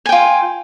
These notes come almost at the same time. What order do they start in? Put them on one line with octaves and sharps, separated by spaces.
G#5 G5 F4